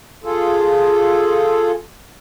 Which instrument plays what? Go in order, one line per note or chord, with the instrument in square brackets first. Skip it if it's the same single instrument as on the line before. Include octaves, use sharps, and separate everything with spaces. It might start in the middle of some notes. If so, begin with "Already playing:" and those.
[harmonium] F4 G#4 A4